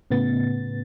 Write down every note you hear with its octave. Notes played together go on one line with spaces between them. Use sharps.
A2 C#3 B3 A6